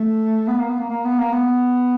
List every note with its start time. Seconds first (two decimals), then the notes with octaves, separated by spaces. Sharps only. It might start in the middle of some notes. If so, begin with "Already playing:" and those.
Already playing: A3
0.48 B3
0.59 A#3
0.69 B3
0.80 A#3
0.91 A#3
1.05 B3
1.19 A#3
1.33 B3